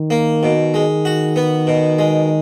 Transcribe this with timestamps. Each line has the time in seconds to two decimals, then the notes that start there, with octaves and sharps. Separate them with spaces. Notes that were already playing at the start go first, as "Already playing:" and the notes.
Already playing: D#3
0.10 A#3
0.43 B2
0.74 G#3
1.05 F#4
1.36 B3
1.67 B2
1.99 G#3